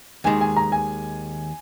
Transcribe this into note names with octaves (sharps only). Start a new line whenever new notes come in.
D#2 D#3 G#3 G#5
G#5
A#5
G#5